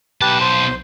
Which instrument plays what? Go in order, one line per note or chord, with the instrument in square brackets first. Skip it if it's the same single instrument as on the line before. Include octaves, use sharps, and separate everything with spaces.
[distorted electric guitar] B1 A5 [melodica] G4 B4
[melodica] C5 C6